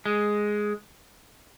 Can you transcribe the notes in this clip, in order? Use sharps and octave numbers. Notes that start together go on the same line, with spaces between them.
G#3